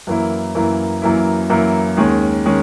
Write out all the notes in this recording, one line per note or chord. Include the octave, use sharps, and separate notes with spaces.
F#2 E3 A#3 E4
F#2 E3 A#3 E4
F#2 E3 A#3 E4
F#2 E3 A#3 E4
D#2 D#3 G#3 C#4
D#3 G#3 C#4